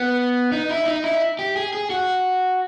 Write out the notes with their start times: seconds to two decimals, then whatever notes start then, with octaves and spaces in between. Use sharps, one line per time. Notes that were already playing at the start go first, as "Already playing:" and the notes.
Already playing: B3
0.52 D#4
0.69 E4
0.86 D#4
1.04 E4
1.39 G4
1.56 G#4
1.73 G#4
1.90 F#4